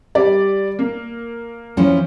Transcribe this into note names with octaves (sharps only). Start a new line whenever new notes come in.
G3 D5
A#3
E3 F3 C#4